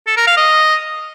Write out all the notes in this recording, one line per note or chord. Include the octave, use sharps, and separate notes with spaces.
A4
A#4
F5
D#5